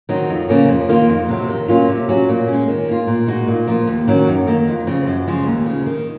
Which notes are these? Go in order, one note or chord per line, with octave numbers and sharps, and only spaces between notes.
D#3 F#3 C4 D#4
F2
C#3 F3 A#3 C#4
F2
D#3 A#3 F4
F2
C3 F#3 C4
D#3
F#3 A#3 C#4 F4
C3
F#3 C#4 F#4
A#2
G#3 C#4
D#3
A#3 F4
A#2
G#3 D#4 F#4
A#2
F3 A#3
D#2
D#3 F#3 C#4 F#4
F#2
D#3 A#3 D#4
F2
C#3 F3 C4
F#2
C#3 F3 G#3
D#2
C#3 F3
D#3